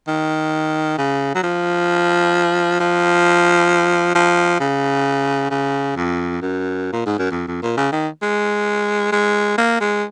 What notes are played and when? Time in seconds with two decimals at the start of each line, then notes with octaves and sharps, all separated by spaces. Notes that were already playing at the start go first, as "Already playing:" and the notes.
0.07 D#3
0.98 C#3
1.35 F#3
1.43 F3
2.80 F3
4.15 F3
4.60 C#3
5.50 C#3
5.96 F2
6.42 F#2
6.92 A#2
7.06 G#2
7.19 F#2
7.31 F2
7.47 F2
7.62 A#2
7.77 C#3
7.92 D#3
8.22 G#3
9.12 G#3
9.58 A#3
9.80 G#3